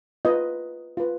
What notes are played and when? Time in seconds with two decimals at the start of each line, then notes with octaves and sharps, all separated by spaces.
0.25 F4 B4 D#5
0.97 F4 B4